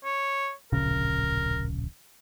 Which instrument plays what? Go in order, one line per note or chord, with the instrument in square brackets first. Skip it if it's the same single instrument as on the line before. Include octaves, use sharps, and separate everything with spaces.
[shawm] C#5
[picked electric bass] D1 A#1 C#3 [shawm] A#4